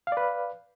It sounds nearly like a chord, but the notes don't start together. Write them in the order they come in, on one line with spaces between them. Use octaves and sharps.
F5 D5 B4